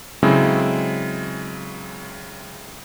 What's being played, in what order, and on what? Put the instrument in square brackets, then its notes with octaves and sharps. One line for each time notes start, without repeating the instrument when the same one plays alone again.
[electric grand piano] C#3 F#3 G#3 C4 E4 A4